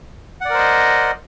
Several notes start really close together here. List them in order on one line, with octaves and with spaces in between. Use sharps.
F#5 D5 A#4 C5 D#5